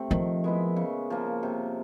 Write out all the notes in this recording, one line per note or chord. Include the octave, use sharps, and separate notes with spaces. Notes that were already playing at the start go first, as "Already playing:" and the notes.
Already playing: C3 A3 C4
D#3 F3
G#3 B3 E4
C#3
F3 A#3
C3